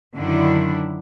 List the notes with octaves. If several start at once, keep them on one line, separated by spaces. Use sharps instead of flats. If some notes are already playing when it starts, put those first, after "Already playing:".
F#2 D3 D#3 D4 E4